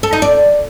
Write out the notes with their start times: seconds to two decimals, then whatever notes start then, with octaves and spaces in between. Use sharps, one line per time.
0.03 A4
0.13 D#4
0.22 D5